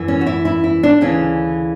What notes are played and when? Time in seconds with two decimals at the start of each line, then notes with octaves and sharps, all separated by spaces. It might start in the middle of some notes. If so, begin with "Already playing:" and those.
Already playing: F#2 E3
0.08 C#4
0.21 F#4
0.26 E4
0.45 E4
0.64 E4
0.83 D4
1.01 D2 C#3 E3 C#4